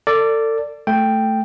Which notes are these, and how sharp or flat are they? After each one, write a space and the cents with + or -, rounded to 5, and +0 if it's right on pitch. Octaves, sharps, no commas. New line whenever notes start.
A4 +35 D5 -5
A3 +0 G5 +0